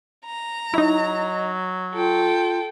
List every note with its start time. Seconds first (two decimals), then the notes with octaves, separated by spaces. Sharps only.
0.25 A#5
0.74 F#3 D#4 E4 D#5
1.94 F4 A4 G5